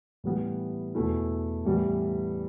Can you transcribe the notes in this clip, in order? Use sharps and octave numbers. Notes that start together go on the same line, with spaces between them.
A2 E3 G3 B3 G4
E2 B2 A3 E4
A2 E3 G3 B3